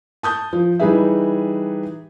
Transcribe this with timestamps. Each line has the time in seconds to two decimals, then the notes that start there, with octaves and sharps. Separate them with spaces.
0.23 A5 D#6 G6
0.53 F3
0.80 E3 G3 D#4 G#4 B4 E5